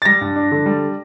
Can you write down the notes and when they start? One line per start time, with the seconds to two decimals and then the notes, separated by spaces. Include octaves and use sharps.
0.02 A6
0.05 G3 A#6
0.21 G2
0.36 D4
0.52 D3
0.66 G3